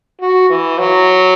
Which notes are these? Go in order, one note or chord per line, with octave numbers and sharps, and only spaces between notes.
F#4
E3
F#3